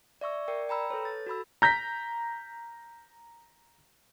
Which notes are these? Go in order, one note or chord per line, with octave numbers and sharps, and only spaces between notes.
D5 E5 C#6 E6
A#4 D5 G5
G5 A#5 B5 E6
A4 B4 C#5
A6
F#4 A4 B5 E6
A#5 G6 A#6 B6